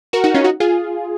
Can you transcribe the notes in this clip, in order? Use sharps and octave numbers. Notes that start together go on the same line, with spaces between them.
F#4 A#4
D#4 F#4
C#4 F4
D#4 F#4
F4 G#4